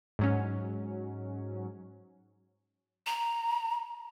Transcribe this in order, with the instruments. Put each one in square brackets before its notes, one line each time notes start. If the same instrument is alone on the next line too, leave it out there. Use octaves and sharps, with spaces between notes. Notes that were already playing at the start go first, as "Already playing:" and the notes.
[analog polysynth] G#2 F#3 C#4
[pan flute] A#5